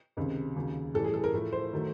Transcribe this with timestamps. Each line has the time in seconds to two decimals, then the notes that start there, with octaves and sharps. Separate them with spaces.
0.17 C#2 C3 D#3
0.56 D#2 C#3 F#3
0.94 A2 E3 G3 A4
1.04 G#4
1.14 A4
1.24 A#4
1.33 A2 F3 A3
1.53 C5
1.73 D#3 F#3 A3